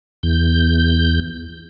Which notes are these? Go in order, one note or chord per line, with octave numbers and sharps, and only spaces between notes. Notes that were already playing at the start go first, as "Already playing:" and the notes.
E2 G6